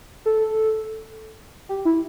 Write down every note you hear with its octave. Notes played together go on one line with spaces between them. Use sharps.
A4
G4
E4